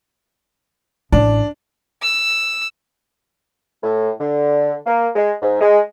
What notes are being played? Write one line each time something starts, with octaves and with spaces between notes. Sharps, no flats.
A1 D4
E6
A2
D3
A#3
G#3
G#2
G#3